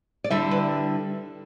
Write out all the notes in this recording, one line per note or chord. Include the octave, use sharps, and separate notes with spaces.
D5
D3 G3 E4 E5
B4